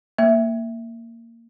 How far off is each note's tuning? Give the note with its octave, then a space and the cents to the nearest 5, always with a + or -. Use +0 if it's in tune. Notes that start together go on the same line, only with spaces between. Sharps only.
A#3 -15 E5 +0